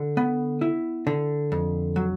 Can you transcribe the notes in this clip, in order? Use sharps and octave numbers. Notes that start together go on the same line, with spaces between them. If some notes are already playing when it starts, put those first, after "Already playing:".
Already playing: D3
B3
E4
D3
F2
F#3